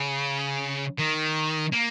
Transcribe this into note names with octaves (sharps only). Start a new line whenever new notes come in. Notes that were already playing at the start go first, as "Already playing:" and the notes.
Already playing: C#3
D#3
A#3